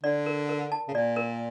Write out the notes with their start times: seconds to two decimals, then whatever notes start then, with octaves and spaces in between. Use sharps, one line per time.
0.03 D3 D5
0.26 A#4
0.49 A#4
0.72 A5
0.88 C#3
0.94 A#2 D5
1.16 A#4